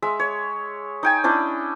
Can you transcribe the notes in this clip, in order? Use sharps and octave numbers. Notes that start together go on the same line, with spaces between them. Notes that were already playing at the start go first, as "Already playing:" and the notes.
G#3 E5
C#5
D#4 G5 G#5
C#4 D4 E4 D#5